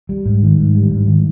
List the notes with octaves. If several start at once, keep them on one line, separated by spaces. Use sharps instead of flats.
G3
G#2
D#3
G#2
G3
G#2
D#3